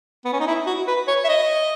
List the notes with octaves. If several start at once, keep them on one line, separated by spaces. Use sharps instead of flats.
B3
C#4
D#4
E4
F#4
B4
C#5
E5
D#5